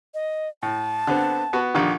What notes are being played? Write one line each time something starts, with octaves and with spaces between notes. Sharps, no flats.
D#5
A2 A5
D3 B3 C4
B3 F#4
A#1 D3 D#3